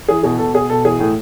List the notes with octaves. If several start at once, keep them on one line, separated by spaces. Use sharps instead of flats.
E3 G#4
B2 G#4
B2 A4
B2 G#4
B2 A4
E3 G#4
A2